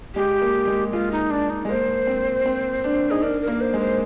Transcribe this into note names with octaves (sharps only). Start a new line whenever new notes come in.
G#3 G4
A#3
G#3
G#3 F4
D#4
D4
D#4
G#3
A#3 C5
C4
C4
D4
D#4 G#4
D4 A#4
A#4
A#3
C5
G#3
C5